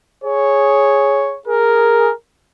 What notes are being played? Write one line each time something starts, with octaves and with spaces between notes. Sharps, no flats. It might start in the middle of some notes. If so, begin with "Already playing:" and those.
G#4 C#5
G#4 A#4